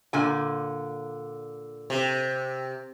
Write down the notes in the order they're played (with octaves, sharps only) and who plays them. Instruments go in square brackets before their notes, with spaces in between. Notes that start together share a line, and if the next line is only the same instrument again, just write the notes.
[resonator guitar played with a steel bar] A#2 D3 G#5
[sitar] C3